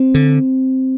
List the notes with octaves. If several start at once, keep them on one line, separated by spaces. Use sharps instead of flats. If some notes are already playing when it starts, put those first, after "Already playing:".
Already playing: C4
D3